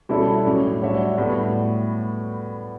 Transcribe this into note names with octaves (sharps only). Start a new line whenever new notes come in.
B2 G3 C#4 E4 A4
A2 F#3 C#4 G4
G3 D4 F#4 C#5 E5
A2 G3 B3 F#4